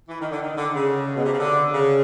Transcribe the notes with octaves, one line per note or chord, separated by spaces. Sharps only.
E3
D#3
D3
D#3
D3
C#3
B2
C3
C#3
D3
C#3